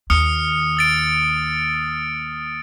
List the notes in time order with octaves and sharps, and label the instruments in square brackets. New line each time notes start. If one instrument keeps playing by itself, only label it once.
[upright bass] D#2 [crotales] D#6 F6 C#7
[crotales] E6 A6 D7